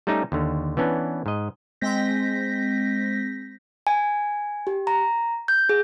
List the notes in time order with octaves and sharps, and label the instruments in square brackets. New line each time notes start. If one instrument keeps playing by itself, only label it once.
[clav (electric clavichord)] G3 A3 C#4 D#4 G4
D#2 D3
E3 B3 C#4 D4
G#2 D#5
[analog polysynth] G#3 C4 G6 A#6 B6
[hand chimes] G#5
G4
A#5
G6
G#4